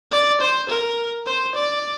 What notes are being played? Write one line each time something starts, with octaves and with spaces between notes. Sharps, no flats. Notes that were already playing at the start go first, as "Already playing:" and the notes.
D5
C5
A#4
C5
D5